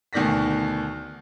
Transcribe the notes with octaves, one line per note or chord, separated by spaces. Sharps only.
D2 B2 D#3 D5 A#6 B6